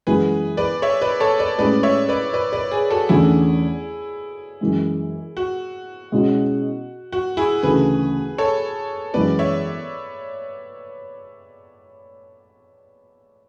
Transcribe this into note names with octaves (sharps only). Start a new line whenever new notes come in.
F#2 E3 G#3 B3 E4 G#4 B4
B4 D5
C#5 E5
B4 D5
A4 C#5
B4 D5
A2 G#3 C#4 G#4 B4 D5
C#5 E5
B4 D5
B4 D5
B4 D5
G#4 B4
F#4 A4
E2 D3 A3 C#4 E4 G#4
F#2 E3 G#3
F#4
B2 G#3 C#4 E4
F#4
E4 G#4
D2 C#3 E3 A3 G#4 B4
A4 C#5
F#2 E3 G#3 B3 B4 D5
C#5 E5